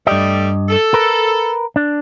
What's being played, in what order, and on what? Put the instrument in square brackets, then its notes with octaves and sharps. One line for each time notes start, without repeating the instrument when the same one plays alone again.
[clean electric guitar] G2 D#5 [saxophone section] G3 A3
[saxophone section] A4
[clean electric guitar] A#4 B4
D4